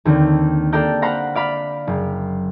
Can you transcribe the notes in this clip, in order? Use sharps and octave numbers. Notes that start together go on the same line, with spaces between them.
D#2 D3 C4
A#3 G4 A4 D5 A#5 G6
C5 F5 F#5 A#5 B5 A#6
D5 F5 B5
F#1